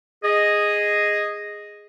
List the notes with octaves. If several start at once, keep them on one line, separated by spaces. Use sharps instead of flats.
G#4 D#5